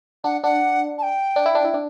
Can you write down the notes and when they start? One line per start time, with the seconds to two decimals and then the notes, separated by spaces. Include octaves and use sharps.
0.24 D4 F#5
0.43 D4 F#5
0.98 A5
1.03 G5
1.36 D4
1.46 E4
1.55 D4
1.64 E4
1.74 D4